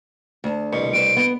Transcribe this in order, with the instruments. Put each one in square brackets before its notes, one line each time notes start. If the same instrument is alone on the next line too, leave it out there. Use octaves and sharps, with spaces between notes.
[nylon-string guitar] D2 A5
[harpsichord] C2 B2
[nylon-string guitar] G3 B4 C5 [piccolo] D7
[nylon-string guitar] B3